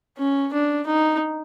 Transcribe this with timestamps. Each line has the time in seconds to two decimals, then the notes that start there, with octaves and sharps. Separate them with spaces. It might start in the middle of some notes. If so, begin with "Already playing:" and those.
0.18 C#4
0.53 D4
0.87 D#4